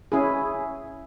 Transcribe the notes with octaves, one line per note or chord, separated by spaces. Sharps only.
C#4 E4 G#4